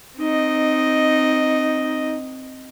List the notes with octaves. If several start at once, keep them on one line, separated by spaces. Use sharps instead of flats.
C4 D#4 D#5